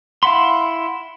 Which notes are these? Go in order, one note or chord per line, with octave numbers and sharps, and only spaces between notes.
E4 F5 F#5 B5 C6